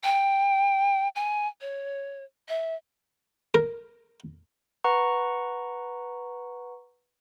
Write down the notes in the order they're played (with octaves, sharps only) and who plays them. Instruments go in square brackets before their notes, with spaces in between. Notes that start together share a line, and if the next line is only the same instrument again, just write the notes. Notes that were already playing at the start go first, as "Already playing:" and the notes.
[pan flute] G5
G#5
C#5
E5
[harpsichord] A#4
[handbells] B4 F#5 A#5 C#6